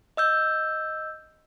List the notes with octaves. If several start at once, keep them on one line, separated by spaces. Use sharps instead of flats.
D#5 E6 G6